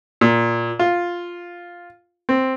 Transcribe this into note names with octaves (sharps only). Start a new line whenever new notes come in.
A#2
F4
C4